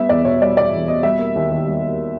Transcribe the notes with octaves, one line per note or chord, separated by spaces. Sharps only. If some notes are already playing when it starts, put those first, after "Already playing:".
Already playing: G3 B3 E5
E2 D5
B2 C#5
G3 D5
B3 D5
E2
B2 D#5
G3 E5
A#3
D#2
D#3
G3
A#3